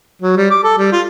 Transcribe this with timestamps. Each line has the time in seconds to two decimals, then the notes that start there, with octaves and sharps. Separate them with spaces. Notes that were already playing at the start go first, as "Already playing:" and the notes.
0.22 F#3
0.36 G3
0.51 D6
0.64 A4
0.78 G3
0.92 F4